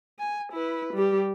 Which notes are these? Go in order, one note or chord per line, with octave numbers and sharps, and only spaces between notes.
G#5
E4 B4
G3 G4